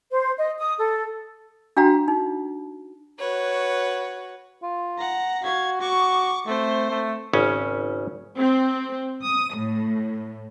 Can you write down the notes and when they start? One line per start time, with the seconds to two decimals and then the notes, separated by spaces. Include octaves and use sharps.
0.10 C5
0.38 D#5
0.58 D#6
0.78 A4
1.77 D4 F#4 F5 G5 A#5
2.08 D#4
3.18 F#4 B4 C#5
4.62 F4
4.98 F#5 A#5
5.44 F#4 F5 G#6
5.81 F#4 C#6 D6
6.46 A3 C4 C5
6.91 A3
7.33 G#1 C#3 C#4
8.36 C4
9.22 D#6
9.56 A2